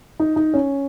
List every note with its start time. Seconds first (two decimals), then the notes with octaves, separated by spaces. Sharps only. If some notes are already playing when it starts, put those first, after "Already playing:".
0.20 D#4
0.36 D#4
0.54 C#4